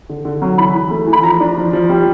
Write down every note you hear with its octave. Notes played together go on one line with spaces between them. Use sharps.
D3
D3
F#3
E3 B5
E3
A3
E3
B5
F3 A#5
D4
F3
F3
G3